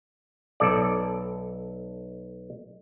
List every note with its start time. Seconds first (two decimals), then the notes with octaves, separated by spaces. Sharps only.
0.60 B1 A4 D5